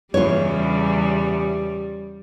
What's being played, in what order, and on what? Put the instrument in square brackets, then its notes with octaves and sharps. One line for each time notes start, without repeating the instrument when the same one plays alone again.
[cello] E2 C#3 [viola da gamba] G3 [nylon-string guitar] F4 C#5